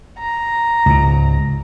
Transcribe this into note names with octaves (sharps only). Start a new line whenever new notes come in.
A#5
C#2 G#2